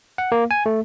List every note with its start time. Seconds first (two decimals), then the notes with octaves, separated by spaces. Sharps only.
0.18 F#5
0.32 A#3
0.51 G#5
0.66 A3